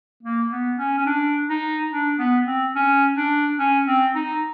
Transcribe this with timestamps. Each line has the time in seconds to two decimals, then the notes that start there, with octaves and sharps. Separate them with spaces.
0.23 A#3
0.51 B3
0.78 C#4
0.98 C#4
1.06 D4
1.49 D#4
1.91 D4
2.19 B3
2.46 C4
2.75 C#4
3.16 D4
3.59 C#4
3.87 C4
4.15 D#4